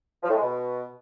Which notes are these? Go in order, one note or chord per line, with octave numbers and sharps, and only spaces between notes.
F3
A2
G#3
B2